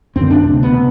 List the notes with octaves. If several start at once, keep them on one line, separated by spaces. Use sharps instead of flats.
F#2 D3 C4
D4
D2 C3 D4
B3
C3